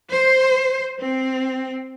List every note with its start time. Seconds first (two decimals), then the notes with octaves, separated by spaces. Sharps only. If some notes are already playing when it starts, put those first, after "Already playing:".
0.10 C5
0.99 C4